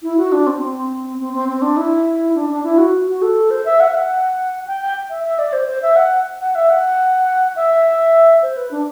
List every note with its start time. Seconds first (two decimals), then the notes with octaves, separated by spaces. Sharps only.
0.03 E4
0.17 F#4
0.32 D4
0.47 C4
0.62 C4
1.20 C4
1.33 C4
1.48 C4
1.62 D4
1.77 E4
2.35 D4
2.49 D4
2.64 E4
2.78 F#4
3.08 F#4
3.22 A4
3.51 C5
3.65 E5
3.80 F#5
3.88 E5
3.95 F#5
4.67 G5
4.81 G5
5.10 E5
5.24 E5
5.39 D5
5.53 C5
5.68 C5
5.82 E5
5.96 F#5
6.40 F#5
6.55 E5
6.70 F#5
7.56 E5
8.42 C5
8.57 B4
8.71 D4